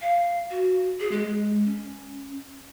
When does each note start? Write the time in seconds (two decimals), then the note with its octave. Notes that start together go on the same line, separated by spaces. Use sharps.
0.01 F5
0.51 F#4
1.00 G#4
1.12 G#3
1.65 C#4